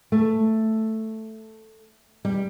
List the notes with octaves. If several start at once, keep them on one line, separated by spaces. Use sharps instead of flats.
A3
G3